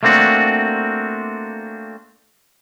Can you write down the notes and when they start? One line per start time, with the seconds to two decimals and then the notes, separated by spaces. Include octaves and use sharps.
0.03 A3 A#3 C4 D4 F#4